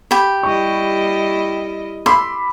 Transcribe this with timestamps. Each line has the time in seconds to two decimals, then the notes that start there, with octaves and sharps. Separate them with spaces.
0.11 G4 B5
0.43 G3 E4 D#5 C#6
2.06 B5 C6 D6 E6